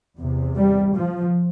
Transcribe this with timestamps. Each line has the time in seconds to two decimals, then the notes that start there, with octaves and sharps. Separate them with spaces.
0.18 E2 C3
0.57 G3
0.95 F3